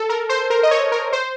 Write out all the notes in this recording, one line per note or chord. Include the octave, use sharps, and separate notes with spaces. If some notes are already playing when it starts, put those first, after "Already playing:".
Already playing: A4
A#4
C5
A#4
D#5
C#5
A#4
C5